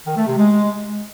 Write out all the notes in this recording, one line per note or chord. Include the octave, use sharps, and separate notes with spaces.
D#3
A3
C3
G#3